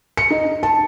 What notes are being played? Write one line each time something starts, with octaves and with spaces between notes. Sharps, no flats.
C#7
D#4
A5